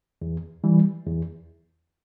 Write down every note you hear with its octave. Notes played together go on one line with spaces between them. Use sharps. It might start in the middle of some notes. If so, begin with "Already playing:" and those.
E2
E3 G3
E2